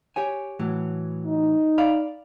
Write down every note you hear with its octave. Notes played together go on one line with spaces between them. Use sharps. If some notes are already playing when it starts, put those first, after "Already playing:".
G4 C#5 G#5
A2 E3 F#3
D#4
D5 F5 B5